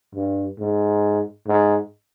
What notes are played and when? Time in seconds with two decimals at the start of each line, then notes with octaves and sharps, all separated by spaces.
0.15 G2
0.59 G#2
1.47 G#2